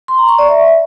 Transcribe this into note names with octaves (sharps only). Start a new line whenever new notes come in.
C6
A#5
C#6
D5
E5